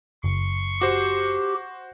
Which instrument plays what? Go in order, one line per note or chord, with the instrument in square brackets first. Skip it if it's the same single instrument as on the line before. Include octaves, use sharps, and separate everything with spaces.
[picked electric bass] F#1 [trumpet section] C6 C#6
[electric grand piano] F#4 C5 [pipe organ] G4